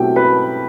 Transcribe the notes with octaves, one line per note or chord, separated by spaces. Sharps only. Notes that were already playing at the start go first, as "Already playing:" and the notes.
Already playing: B2 F#3 A3 C4 E4 G4 G5
B4 B5